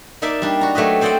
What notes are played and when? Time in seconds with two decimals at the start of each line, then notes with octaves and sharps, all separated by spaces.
0.22 A#3 D#4 D5 E5 A5
0.42 G3 D4
0.61 F#4 A#5
0.75 F#3 A3 G4 B4 D#5
1.01 C4 C5 D5 D#5 F#5 G5